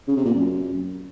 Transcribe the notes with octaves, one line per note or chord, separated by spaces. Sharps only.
C#3
C3
A#2
F#2